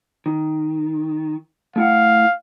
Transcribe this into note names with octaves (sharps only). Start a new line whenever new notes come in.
D#3
A3 E4 F5 F#5